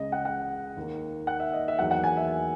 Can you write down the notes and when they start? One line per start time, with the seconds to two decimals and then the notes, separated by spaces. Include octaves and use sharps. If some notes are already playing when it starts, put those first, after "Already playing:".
Already playing: C#2 C#3 G#3 D#5
0.12 F#5
0.25 F#5
0.76 D#2 D#3 A#3
1.27 F#5
1.40 E5
1.53 D#5
1.68 E5
1.78 E2 D#3 F#3 A#3 F#5
1.91 F#5
2.04 G#5
2.17 E5